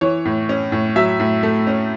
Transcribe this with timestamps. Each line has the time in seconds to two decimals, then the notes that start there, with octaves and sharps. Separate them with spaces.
0.01 E3 C#5
0.25 A2
0.49 C#4
0.72 A2
0.96 F#3 E5
1.20 A2
1.43 A3
1.67 C#4